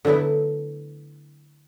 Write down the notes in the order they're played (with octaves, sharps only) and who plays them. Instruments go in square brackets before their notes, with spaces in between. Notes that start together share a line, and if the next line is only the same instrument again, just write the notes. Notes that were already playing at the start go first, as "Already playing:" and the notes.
[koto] D3 F#3 A3 B3 E4